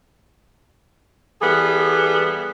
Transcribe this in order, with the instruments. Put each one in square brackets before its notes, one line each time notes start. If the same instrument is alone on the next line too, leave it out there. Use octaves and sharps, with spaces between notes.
[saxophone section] E3 G3 B3 G#4 A4